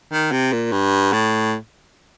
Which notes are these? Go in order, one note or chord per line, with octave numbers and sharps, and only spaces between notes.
D#3
C3
A#2
G2
A2